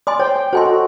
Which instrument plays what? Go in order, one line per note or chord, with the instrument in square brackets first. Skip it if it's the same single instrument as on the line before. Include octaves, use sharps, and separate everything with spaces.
[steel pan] D5 [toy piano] G#5 C6 D#6
[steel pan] C5 G5 [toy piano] C#5
[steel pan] G5
[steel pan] F#4 A4 D#5 [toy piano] C5 G#5 C6
[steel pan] F#4